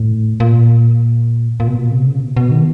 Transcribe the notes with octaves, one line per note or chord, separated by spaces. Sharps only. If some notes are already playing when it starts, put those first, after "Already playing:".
Already playing: A2
A#2
A#2
B2
A#2
C3
C#3
B2
B2
D#3